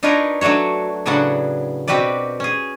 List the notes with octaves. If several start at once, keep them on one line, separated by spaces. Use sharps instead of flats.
D4 D#4 F4 A#4 B4 C#5
F#3 A3 D4 F#4 C#5
A2 C#3 F#3 B3 D4 F#5
B2 C4 F#4 G4 B4 D5
C#4 G#4